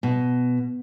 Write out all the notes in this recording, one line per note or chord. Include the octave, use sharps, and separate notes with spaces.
B2